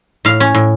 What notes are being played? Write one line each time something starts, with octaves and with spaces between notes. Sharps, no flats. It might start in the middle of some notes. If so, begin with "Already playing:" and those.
A2 F5
C#4
A2